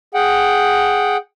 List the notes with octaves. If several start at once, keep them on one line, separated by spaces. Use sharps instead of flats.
G#4 F#5 G5